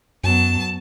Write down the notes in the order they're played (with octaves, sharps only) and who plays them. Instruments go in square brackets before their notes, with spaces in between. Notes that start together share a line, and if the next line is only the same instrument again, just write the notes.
[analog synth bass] F#2 [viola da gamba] F#3 B3 [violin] A5